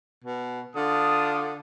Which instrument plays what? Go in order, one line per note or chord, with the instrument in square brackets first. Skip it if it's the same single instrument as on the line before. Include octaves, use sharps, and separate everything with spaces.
[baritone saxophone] B2
[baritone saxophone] D3 [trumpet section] D4 F4 D#6